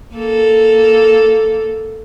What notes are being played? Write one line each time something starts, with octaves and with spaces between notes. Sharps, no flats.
A#3 A4